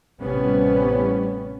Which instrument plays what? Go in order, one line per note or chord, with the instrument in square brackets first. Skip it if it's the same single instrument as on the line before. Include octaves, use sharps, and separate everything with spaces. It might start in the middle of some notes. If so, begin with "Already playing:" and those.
[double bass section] A1 C3 G3 B3 C#4